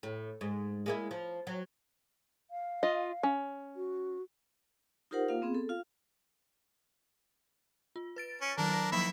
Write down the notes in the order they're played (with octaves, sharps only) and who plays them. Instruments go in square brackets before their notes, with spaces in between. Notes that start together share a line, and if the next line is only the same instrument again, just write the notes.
[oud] A2
G#2
G#3 A#3 E4
F3
F#3
[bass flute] F5
[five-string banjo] F4 D#5
C#4
[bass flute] F#4
[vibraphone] D#4 F4 G4 A#4 C5 F#5
A#3 F4 F5
B3 C4 G#4
A4
F4 F5
[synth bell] F4
B4 A6 D7
[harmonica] C#4
[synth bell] D#3 F#3 [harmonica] D4 A#4
[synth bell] F#3 A#6
[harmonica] D#3 E4 E5 [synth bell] F3 F#3 A#3